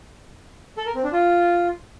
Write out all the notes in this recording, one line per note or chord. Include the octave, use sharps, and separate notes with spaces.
A4
A#4
C4
D4
F4